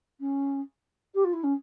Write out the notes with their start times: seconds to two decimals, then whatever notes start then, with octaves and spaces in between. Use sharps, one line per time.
0.20 C#4
1.14 G4
1.24 F4
1.33 E4
1.43 C#4